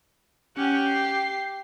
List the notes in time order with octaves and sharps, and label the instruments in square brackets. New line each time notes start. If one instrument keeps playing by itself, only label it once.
[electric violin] C#4 F#5 [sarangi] G4
[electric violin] C7